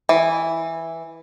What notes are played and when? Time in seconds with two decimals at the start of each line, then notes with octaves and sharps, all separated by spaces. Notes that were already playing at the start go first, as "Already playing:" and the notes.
0.09 E3